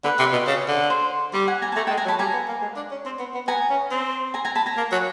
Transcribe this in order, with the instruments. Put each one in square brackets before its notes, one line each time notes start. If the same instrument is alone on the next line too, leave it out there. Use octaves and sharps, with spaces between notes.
[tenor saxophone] D3 [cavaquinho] B4
[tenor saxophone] C3
B2
C#3
D3
[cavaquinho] C5
[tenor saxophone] G3 [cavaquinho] D5
[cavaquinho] F#5 G#5
G#5 A#5
A5
[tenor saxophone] A3 [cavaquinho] G#5 A#5
[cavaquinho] G5 A5
[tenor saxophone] G#3
[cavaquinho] G#5 A#5
[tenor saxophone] F#3
[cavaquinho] A5 B5
[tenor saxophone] G3 [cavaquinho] G#5 A#5
[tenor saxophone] B3
A#3
G#3
D4
C#4
C4
B3
B3
[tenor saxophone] B3 [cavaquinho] G#5 A#5
[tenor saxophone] C#4
C4
[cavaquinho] G#5 A#5
G#5 A#5
A5 B5
G#5 A#5
[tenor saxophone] A#3
F#3